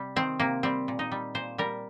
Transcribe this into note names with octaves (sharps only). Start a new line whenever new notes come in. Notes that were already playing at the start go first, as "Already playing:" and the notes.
Already playing: C3 G3
D#3 C4
C3 A#3
G3 C4
A#2
D#4
G3
A#2 C5
G3 A#4